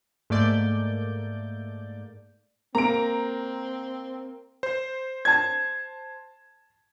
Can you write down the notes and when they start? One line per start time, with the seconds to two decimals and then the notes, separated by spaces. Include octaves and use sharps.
0.30 G#2 A3 A#3 D5 G6
2.75 A#3 C4 A#5 D7
4.63 C5
5.25 A5 G#6